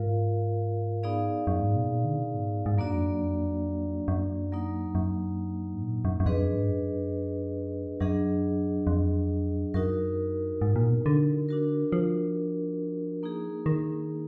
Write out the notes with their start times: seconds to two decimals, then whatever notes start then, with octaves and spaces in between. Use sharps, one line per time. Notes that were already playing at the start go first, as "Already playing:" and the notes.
Already playing: G#2 F4 A#4 F5
1.03 B3 D#4 G#4 D5 F5
1.47 F#2
1.61 G#2
1.76 B2
1.90 A#2
2.05 D3
2.19 B2
2.34 G#2
2.66 G#2
2.77 F#2 F#3 A#3 D4 F#4 D5
2.93 F2
3.06 F#2
3.22 F2
4.08 F#2
4.52 F#3 A#3 D#4
4.95 F#2
5.75 G#2
5.82 A#2
6.05 F#2
6.20 F#2
6.26 F2 D4 G#4 B4 D#5
6.41 F#2
6.55 G#2
6.69 F#2
8.00 F#2 F#3 D4 G#4 D#5
8.87 F2
9.74 F#2 D#4 F#4 A#4
10.61 G#2
10.76 A#2
10.90 B2
11.06 D3
11.49 D4 F#4 A#4
11.92 F3
13.23 A#3 D#4 G#4
13.66 D#3